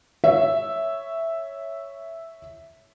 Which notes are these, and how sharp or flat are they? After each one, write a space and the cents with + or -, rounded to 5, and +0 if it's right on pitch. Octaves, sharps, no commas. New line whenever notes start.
C#5 +0 E5 +0